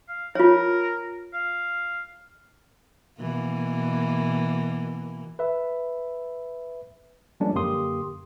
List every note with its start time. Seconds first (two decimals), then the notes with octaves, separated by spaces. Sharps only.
0.08 F5
0.35 F4 A#4 C#5
1.33 F5
3.20 B2 E3 A#3
5.39 B4 E5
7.40 F3 G3 G#3 A#3 C#4 D4
7.55 F#2 D3 A#3 G4 C6 D#6